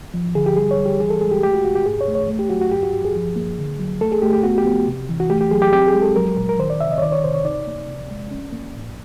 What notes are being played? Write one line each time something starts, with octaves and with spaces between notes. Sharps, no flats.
F3
D3 G#4
G4
G3 G#4
C#5
G3
G4
E3 G#4
A4
G#3 G#4
G4
A3 G4
F#4
C3 F#4
G4
G#2 G#4
C#5
A3
C#5
A3
G4
F#3 F#4
F#4
G2 G4
F#4
G2
G#4
F3
A#3
D3
F#3
A3 A4
G#4
A3 G4
G4
B3 F#4
G4
B3
C3
E3
F#4
A3 G4
G4
F#3 G#4
G4
C4 G4
G#4
G#3
A4
F#3 A#4
A#2 A#4
A#4
D#3 C5
D5
C3 E5
D#5
C#5
D#3 D5
C#5
C3 C5
C#5
D#4 D5
A#3
C3
G#3
C#4
A#3
A2